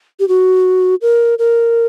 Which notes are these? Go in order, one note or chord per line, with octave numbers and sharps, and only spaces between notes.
G4
F#4
A#4
A#4